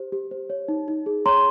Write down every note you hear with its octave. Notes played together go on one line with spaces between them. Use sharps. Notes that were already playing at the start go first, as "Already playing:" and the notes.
Already playing: G4 C5
G4
C5
C#5
D#4
D#4
G#4
C#5 A#5 C6